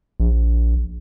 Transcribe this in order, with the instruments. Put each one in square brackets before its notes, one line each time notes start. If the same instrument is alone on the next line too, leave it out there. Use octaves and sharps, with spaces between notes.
[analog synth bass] A#1